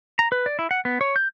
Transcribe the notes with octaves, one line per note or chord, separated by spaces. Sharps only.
A#5
B4
D5
E4
F#5
B3
C#5
G6